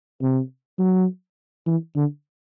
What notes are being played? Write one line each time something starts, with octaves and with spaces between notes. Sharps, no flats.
C3
F#3
E3
D3